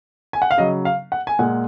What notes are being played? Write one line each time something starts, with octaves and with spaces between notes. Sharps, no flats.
G#5
F#5
F5
C#3 F#3 D#5
F5
F#5
G#5
A#2 G#3 F#5